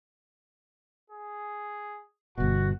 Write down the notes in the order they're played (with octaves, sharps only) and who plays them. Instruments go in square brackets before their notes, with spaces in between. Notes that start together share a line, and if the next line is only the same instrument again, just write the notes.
[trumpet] G#4
[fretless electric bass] G1 B2 [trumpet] F#4